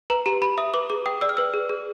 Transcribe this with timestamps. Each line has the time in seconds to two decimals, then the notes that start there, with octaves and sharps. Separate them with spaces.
0.10 B4 A#5
0.26 G4 A#5
0.42 G4 B5
0.58 E5 D#6
0.74 B4 D6
0.90 G#4 D6
1.06 G5 D#6
1.21 D5 E6
1.29 F6
1.37 B4 E6
1.54 G#4
1.69 G#4